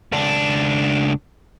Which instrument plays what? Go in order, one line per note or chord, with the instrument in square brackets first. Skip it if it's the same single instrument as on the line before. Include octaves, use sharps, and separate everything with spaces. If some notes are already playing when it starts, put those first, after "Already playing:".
[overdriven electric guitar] C#2 D4